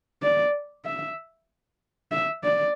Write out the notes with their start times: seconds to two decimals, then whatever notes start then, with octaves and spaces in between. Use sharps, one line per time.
0.23 D5
0.85 E5
2.12 E5
2.44 D5